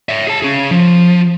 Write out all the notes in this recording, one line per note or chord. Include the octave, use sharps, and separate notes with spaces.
C#5 E5
G#4 A5
C#4 G#4
F3